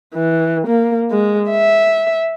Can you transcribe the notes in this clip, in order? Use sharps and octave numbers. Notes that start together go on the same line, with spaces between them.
E3
A#3
G#3
E5